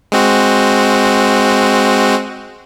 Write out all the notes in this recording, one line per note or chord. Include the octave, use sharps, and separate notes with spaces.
G#3 C4 F#4